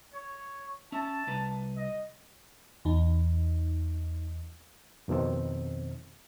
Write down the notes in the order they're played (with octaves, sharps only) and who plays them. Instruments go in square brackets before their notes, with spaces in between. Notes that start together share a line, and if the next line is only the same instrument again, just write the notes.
[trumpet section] C#5 C#6
[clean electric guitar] C#4 E5 [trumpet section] A5
[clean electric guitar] C2 B4 A#5
[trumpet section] D#5
[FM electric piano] E2 D#4
[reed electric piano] F2 B2 D#3 C4